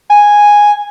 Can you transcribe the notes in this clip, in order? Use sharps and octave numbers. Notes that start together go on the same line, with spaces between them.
G#5